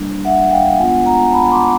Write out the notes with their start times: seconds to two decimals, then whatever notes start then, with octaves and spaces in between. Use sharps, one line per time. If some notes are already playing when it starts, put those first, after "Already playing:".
Already playing: G3 A#3 D4
0.25 E5 F#5
0.51 F5 G5
0.79 G#3 B3 D4 F4 F#5 G#5
1.06 G#5 A#5
1.33 A5 B5
1.51 C6 D6